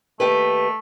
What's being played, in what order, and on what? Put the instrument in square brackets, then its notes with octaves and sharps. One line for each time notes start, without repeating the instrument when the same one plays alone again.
[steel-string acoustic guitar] D#2 G4 B4 [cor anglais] A3